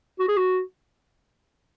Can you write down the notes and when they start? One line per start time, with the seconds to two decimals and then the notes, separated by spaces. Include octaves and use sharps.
0.20 F#4
0.28 G#4
0.37 F#4